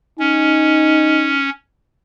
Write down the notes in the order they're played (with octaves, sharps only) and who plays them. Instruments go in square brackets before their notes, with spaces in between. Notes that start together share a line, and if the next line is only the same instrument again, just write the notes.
[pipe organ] C#4 [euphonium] D#4